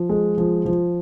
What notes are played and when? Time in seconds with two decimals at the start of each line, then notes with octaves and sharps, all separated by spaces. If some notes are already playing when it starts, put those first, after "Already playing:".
Already playing: F3
0.09 G#3
0.37 F3
0.65 F3